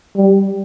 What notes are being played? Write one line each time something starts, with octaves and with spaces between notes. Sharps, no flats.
G3